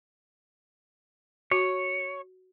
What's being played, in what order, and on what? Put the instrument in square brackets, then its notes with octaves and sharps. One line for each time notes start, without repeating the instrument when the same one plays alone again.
[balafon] F#4 [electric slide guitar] C#5